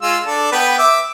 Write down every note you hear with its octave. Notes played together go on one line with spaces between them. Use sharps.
G#3 F4 E6
D4 A4
B3 B4 G5
E5 D6